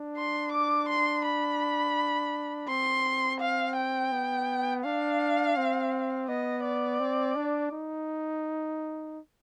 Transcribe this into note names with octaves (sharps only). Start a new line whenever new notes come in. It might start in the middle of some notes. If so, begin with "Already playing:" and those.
Already playing: D4
C6
D6
C6
B5
C4 C6
F5
G5
B3
D4 F5
C4
B3 D#5
D5
C4
D4
D#4